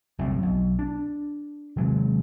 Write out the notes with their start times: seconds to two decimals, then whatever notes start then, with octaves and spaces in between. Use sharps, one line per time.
0.19 G1 C2 F#2 A2
0.42 B1
0.79 D4
1.76 C3 D#3 F#3 G#3